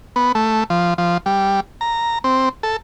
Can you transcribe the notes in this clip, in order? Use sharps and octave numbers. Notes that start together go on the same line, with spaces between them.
B3
A3
F3
F3
G3
A#5
C4
A4